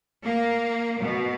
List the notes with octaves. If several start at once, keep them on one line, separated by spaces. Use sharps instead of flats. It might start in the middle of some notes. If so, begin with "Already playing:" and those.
A#3
B2